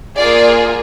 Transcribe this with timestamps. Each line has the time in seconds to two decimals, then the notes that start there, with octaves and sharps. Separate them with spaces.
0.17 A#3 F4 G#4 D5